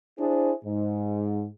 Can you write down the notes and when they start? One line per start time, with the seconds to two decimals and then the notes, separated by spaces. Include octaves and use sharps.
0.19 D4 E4 G#4 C5
0.65 G#2